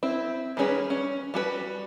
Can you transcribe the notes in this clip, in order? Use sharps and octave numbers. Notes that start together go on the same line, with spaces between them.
C4 E4
D#3 G3 C#4 G#4 B4
C#4
G3 F#4 G#4 B4